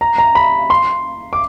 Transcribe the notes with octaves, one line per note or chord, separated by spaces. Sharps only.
A#5
A#5
B5
C6
D6